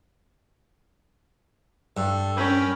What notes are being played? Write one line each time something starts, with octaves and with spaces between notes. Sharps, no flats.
G2 A4
C#4 A#4 G5 B5